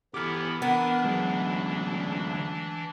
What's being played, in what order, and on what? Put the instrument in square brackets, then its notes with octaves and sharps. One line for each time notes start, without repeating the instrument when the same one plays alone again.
[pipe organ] E3 B3 E4 [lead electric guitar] G4 A4 [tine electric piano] D6 F6
[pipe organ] E3 D4 [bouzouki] B3 [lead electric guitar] A#4
[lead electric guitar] D2 F4 [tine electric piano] F#3 G#3